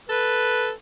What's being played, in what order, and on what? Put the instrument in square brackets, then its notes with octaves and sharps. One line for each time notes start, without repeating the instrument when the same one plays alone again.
[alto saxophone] A4 [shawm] B4